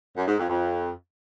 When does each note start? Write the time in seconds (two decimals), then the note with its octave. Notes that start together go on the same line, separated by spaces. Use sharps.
0.16 F#2
0.27 G#2
0.38 F2
0.49 F2